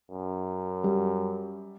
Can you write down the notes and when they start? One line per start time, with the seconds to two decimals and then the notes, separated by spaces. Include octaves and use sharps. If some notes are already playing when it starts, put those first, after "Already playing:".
0.11 F#2
0.84 G3